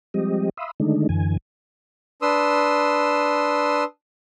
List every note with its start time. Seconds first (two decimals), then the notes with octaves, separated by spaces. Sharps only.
0.14 F3 G3 G#3 C4 G4 D#5
0.57 E5 F5 B5 C6 D#6 E6
0.80 D3 D#3 G#3 A3 D4 D#4
1.09 F#2 D3 E3 G#5
2.22 D4 B4 C6 D#6 E6